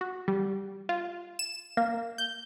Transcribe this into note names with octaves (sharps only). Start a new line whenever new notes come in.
F#4
G3
F4
E7
A#3
G6